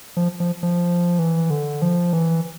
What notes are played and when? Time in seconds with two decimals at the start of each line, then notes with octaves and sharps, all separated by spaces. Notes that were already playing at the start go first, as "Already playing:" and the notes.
0.17 F3
0.40 F3
0.63 F3
1.19 E3
1.50 D3
1.82 F3
2.13 E3